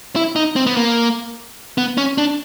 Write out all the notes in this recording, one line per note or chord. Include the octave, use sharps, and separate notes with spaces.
E4
D#4
C4
B3
A#3
B3
C#4
D4